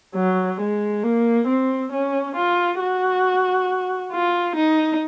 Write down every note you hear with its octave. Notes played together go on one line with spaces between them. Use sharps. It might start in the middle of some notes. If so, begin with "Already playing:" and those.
F#3
G#3
A#3
C4
C#4
F4
F#4
F4
D#4